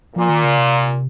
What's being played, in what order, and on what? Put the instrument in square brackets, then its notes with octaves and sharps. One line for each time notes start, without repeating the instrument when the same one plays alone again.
[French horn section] A#2 [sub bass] F3
[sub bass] D#3
C#3
C3